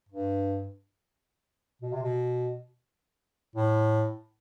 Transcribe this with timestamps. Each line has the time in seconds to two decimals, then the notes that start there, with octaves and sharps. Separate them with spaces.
0.09 G2
1.82 B2
1.93 C3
2.03 B2
3.56 A2